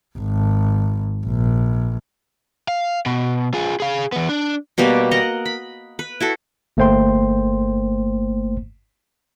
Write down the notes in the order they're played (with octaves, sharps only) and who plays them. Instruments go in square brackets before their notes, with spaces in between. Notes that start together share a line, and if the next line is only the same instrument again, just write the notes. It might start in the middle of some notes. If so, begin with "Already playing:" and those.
[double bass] G#1
A#1
[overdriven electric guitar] F5
B2
F4 G#4
G#4 F5
E3 B3
D4
[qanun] B2 G3 A#3 G4
A#4 D#5 F#5 A#5
B5
B4
E4 F#4 A4
[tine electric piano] G1 A3 A#3 C5 G5 C6